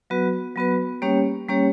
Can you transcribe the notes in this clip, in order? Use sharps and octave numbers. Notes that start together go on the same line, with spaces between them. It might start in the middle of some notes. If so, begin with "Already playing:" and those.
F#3 B3 F#4 B4
F#3 B3 F#4 B4
G3 A#3 C#4 G4 C#5
G3 A#3 C#4 G4 C#5